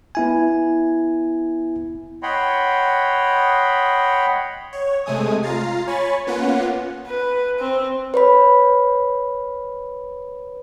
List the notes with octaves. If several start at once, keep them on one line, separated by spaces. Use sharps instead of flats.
B3 E4 G#5
C#5 D#5 F#5 G5 B5 C6
C#5
C3 G#3 A3 G#5 D#6
F4 A#5 A6 C7
C#5 G#5 B5 C#6 A6
A#3 B3 C#4 F4 F#5
B4
C4
B4 C#5 B5